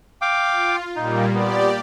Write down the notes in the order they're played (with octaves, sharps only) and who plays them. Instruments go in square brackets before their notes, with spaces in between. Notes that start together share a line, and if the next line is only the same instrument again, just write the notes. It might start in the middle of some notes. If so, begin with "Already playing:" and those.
[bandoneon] F5 G5 D6
[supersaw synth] F4
[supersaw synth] A#2 G3 A#3 [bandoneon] D#4
[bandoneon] A#2 B3 [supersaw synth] G4 D5